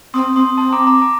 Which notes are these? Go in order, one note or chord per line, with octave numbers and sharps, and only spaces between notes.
C4 C6 D#6
C4 C6 D#6
C4 A5 C6
A#5 D6
A#5 D6
A#5 D6